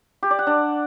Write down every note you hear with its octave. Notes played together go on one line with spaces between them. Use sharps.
G4
D5
F#5
D4